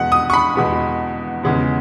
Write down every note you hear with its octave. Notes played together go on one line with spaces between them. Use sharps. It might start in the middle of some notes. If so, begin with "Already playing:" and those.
Already playing: E2 B2 G#3 B3 F#5
D#6
C#6
B5
E2 B2 G#3 B3
E2 C#3 G#3 B3